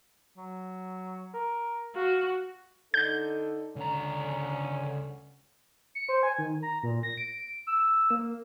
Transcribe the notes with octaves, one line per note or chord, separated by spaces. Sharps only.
F#3
A#4
F#4 F5
D3 D#4 A4 G6
C#2 D3 C#4 A#5
C#7
C5
G#5
D#3
A#5
A#2
A#6
D7
E6
A#3